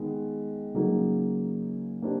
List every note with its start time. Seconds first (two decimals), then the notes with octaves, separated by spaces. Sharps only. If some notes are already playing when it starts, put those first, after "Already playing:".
Already playing: D#3 G#3 B3
0.74 C#3 F#3 A#3 D#4 G#4
2.02 A#3 D4 G4 C5